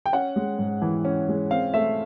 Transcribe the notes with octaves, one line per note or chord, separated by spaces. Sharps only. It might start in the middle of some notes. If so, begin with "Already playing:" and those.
G5
C#4 F#5
G#3
G#2
E3
C#4
G#3
C4 F5
A3 E5